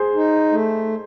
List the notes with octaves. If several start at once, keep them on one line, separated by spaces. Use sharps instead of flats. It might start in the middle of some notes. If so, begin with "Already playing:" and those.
Already playing: G#4 C5
D#4
A3